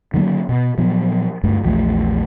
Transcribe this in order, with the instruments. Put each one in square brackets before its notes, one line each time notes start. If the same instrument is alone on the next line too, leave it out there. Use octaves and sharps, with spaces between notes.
[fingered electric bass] D3 D#3 F#3 A#3
B2
A#2 F3 F#3 B3
D2 G2 A3
A#1 E2 F3 A3